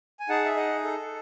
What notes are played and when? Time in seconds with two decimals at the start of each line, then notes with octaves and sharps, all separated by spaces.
0.20 G#5
0.29 D#4 G#4 F#5 A5
0.45 E5
0.56 D#5 F#5
0.84 A4